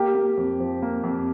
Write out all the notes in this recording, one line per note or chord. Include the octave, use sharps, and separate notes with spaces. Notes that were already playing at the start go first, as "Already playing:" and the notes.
Already playing: A#3 G4
A#3
F2
F3
A#3
F2